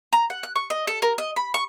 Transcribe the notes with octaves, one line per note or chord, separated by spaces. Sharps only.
A#5
F#5
F#6
C#6
D#5
A4
A#4
D#5
B5
C#6